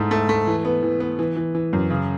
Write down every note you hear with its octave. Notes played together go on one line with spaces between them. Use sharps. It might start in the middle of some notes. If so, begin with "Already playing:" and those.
Already playing: G#2 A3 E4
A3
A3
E3
B3
E3
B3
E3
E3
E3
F#2
C#3